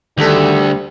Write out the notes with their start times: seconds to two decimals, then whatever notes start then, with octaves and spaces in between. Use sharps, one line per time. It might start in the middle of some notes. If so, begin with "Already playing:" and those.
0.18 D2 D#3 G3 B3 A4